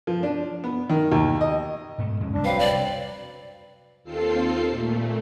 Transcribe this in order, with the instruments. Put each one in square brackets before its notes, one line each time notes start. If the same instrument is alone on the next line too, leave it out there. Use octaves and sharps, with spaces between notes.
[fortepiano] F3
D4
B3
D#3
D#2
D#5
[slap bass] G#2 B2 A3
F2 G#3 C#4
[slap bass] F1 C2 [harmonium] D4
[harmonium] F#3 C4 B4 [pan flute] F5
[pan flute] D5
[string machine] D#2 C4 F4 A4 C7
A#2 A3